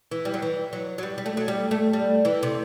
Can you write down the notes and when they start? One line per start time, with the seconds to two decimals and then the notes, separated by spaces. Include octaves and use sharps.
0.11 E3
0.25 G3
0.34 F#3
0.42 E3
0.73 F#3
0.98 F#3
1.03 G3
1.18 G3
1.26 A3
1.37 F#3
1.48 G3
1.71 A3
1.93 G3
2.25 E3
2.43 C3